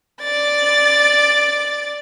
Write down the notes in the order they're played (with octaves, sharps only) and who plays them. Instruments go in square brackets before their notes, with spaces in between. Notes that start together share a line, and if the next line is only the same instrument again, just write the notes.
[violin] D5 A6